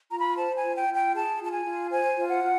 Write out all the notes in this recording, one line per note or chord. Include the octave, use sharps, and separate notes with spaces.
F4 A#5
B5
C5 A5
G#5
F4
G5
F4
G5
G#4 A5
F4
A5
G#5
F4
C5 G#5
F4
F#5
F4